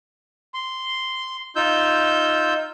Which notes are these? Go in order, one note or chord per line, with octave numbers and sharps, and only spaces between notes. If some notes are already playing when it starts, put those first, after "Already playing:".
C6
D#4 F4 E6 G6